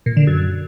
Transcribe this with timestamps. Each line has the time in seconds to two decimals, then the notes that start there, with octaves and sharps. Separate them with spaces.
0.06 A#2
0.17 D3
0.27 F#2